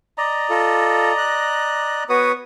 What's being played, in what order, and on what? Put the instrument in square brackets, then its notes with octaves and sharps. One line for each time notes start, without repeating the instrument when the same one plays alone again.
[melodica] D5 D#5 A#5
[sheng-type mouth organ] F4 A4
F#6
[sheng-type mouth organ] B3 B4 C#5 [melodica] F#4 D#6